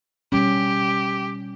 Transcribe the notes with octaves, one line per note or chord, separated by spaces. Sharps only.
B2 G3 C#4 G4